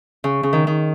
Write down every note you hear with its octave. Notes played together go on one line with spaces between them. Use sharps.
C#3
C#3
D#3
D#3